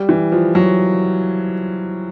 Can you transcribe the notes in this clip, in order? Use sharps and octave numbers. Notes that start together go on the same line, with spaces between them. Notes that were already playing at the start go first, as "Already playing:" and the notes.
Already playing: G3
E3
F3
F#3